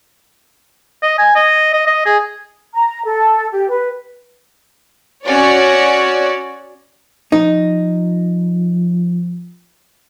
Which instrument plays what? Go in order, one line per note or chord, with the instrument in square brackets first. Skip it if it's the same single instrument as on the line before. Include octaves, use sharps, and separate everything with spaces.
[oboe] D#5
G#5
D#5
D#5
D#5
G#4
[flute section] A#5
A4
G4
B4
[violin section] C#4 F#4 C#5 D5
[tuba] F3 [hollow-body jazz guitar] D#4